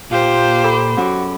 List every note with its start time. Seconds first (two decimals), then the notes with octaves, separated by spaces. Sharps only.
0.11 A#2 F4 G4 C5
0.64 A4 B5 D6
0.97 F#2 F#4 D6